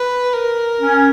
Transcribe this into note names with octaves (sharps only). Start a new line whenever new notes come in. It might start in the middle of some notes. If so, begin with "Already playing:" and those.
Already playing: B4
A#4
C#4